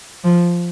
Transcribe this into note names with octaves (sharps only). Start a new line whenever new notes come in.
F3